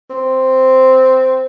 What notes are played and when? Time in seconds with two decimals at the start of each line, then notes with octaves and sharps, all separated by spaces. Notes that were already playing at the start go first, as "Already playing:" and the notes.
0.10 C4